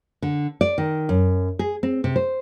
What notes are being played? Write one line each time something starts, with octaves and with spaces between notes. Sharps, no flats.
D3
D5
D#3
F#2
G#4
C4
C3
C5